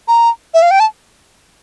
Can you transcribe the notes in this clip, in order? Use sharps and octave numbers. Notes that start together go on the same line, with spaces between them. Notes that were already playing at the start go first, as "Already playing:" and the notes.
A#5
E5
F5
G5
A5